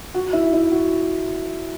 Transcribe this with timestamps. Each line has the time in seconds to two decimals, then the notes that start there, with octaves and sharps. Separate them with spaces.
0.14 F#4
0.33 E4
0.53 E4
0.72 F#4